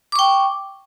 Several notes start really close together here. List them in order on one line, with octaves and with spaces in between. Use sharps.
D6 C#6 G5